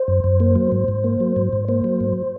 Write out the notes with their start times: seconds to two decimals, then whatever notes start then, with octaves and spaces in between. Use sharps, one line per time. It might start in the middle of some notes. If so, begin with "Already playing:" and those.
Already playing: C5
0.08 F#2
0.24 F#2
0.40 A#3
0.56 F#3
0.72 G#2
0.88 G#2
1.04 A#3
1.20 F#3
1.36 G#2
1.53 G#2
1.68 A#3 C5
1.84 F#3
2.00 G#2